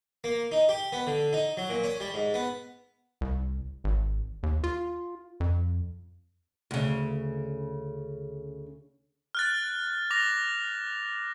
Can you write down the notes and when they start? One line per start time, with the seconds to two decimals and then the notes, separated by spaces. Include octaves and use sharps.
0.24 A#3
0.52 D#4
0.69 G4
0.92 B3
1.07 D3
1.33 D#4
1.57 F#3
1.70 A#2
1.84 C#4
2.00 G3
2.14 G#2
2.34 B3
3.21 C2
3.84 G#1
4.43 D#2
4.64 F4
5.40 F2
6.71 D2 C#3
9.35 F6 F#6 A6
10.11 D6 A#6 F7